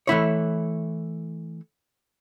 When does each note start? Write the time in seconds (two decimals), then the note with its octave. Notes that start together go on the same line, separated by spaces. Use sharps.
0.07 E3 A3 E4 C#5